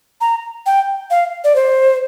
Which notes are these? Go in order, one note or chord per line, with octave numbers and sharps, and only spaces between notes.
A#5
G5
F5
D5
C5